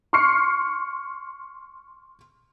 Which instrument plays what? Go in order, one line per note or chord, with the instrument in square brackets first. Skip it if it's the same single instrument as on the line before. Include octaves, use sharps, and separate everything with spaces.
[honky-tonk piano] C6 C#6 F6 C7 C#7